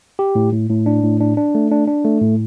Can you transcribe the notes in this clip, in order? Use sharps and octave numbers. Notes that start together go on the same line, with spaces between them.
G4
A2
A2
A2
D4
A2
D4
D4
A3
D4
D4
A3
A2